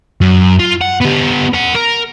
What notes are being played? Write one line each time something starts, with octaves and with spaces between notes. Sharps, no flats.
F#2
F4
F#5
B3 G4
A#4 F#5
A#4